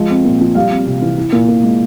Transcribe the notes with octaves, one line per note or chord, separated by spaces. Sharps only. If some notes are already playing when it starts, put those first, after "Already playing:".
Already playing: F3 G#3
C4
A#2
F3
G3 F5
C4
C3
E3
E4
A#2
A#2
G#3